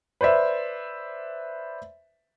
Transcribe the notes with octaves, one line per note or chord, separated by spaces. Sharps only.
B4 C5 D5 E5